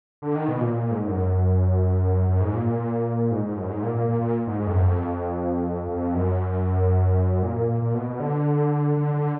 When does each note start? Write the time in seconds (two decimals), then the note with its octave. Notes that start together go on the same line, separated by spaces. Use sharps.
0.22 D3
0.35 D#3
0.48 B2
0.61 A#2
0.74 A#2
0.91 G#2
1.01 G#2
1.08 F#2
2.29 F#2
2.41 G#2
2.54 A#2
2.67 A#2
3.31 G#2
3.44 G#2
3.56 F#2
3.70 G#2
3.83 A#2
3.95 A#2
4.08 A#2
4.21 A#2
4.47 G#2
4.60 G#2
4.67 F2
4.73 F#2
4.85 F2
5.89 F2
6.14 F#2
7.43 A#2
7.56 A#2
7.69 A#2
7.82 A#2
7.94 B2
8.10 B2
8.20 D3
8.97 D3
9.14 D3